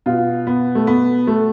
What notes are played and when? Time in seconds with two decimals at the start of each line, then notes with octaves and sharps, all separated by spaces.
0.06 B2 F4
0.47 B3
0.75 A3
0.87 B3
1.27 A3